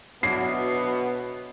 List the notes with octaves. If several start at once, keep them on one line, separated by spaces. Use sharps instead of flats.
B2 F#3 B3 D4 E4 C7